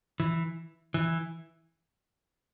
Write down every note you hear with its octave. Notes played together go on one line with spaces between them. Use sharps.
E3
E3